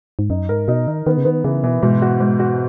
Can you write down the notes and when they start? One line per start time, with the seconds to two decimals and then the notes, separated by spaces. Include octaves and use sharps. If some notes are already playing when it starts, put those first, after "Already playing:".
0.19 G#2
0.30 F#2 D#4
0.49 G#2 A#4
0.68 B2 D#4
0.87 D#3 D#4
1.06 D#3 B3
1.18 C#3
1.25 D#3 B3
1.44 C#3 E3
1.64 B2 E3
1.82 G#2 B2
2.02 F#4
2.20 G#2
2.39 F#4